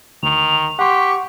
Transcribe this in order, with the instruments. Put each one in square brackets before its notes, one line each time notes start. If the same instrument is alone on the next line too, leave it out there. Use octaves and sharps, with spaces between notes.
[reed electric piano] D2 [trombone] D#3 [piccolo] F7
[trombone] G4 [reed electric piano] F#5 C6 [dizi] C#6 [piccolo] B6